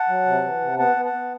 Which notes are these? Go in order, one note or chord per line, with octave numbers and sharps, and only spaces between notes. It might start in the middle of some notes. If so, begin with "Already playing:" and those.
Already playing: F#5 A5
F#3
C3
E3
C3
B3 F#5 A5
B3
F#5 A5
B3